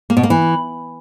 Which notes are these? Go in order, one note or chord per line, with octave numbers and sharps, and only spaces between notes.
A#3
B2
A#3
E3